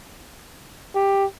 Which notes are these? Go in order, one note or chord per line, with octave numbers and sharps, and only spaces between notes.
G4